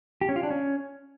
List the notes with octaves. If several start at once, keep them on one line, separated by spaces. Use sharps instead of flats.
G4
C#4
F4
D4
C#4